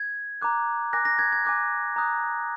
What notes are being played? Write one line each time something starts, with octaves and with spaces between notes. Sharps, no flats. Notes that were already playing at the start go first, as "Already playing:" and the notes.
Already playing: G#6
A#5 D6 F#6
G#5 D6 F#6 A#6
A#6
G#6
G#6
G#5 D6 F#6
A#5 D#6 F#6